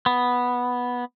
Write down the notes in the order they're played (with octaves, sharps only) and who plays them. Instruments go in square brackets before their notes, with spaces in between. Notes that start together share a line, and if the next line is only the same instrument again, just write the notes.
[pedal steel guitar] B3